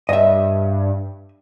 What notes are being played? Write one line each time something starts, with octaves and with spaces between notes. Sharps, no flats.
G2 D#5 E5